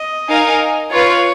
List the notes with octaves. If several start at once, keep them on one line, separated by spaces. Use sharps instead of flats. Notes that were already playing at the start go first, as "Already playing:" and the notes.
Already playing: D#5
D#4 A#4 F5 G#5
F4 B4 C#5 F5